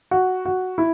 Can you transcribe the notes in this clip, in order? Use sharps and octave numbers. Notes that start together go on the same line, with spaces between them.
F#4
F#4
E4